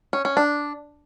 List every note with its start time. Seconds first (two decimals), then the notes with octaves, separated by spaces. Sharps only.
0.13 C#4
0.25 C#4
0.37 D4